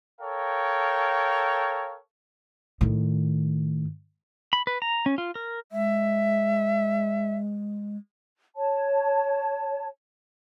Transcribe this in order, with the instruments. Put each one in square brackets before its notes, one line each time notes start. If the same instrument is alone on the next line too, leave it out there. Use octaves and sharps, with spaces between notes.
[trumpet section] A4 A#4 C#5 F5 G5
[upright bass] A2 D#3
[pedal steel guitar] B5
B4
A#5
C#4
F4
A#4
[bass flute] G#3 [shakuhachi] E5
[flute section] C#5 A5